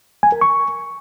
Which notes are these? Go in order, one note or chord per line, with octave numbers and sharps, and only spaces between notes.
G#5
A#4
C#6